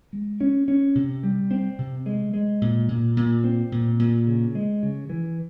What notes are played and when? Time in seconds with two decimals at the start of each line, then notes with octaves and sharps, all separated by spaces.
0.13 G#3
0.41 C#4
0.68 C#4
0.95 C3
1.23 G3
1.51 C4
1.78 C3
2.06 G#3
2.34 G#3
2.62 A#2
2.88 A#2
3.17 A#2
3.44 C4
3.72 A#2
3.99 A#2
4.27 C#3
4.55 G#3
4.83 C#3
5.10 E3